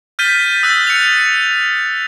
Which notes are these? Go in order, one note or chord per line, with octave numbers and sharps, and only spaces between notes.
F6 G6 A6 B6 D#7 G7
D#6 E6 F#6 A6
C#7 F7